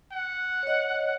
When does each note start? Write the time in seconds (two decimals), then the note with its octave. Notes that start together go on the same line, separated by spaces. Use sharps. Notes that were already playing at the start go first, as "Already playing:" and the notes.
0.12 F#5
0.63 C#5 D#5